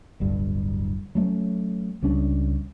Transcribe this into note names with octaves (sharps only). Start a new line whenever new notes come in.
D1 G1 G2
F#3 A3 A#3 C#4
C#2 G3 C#4 D4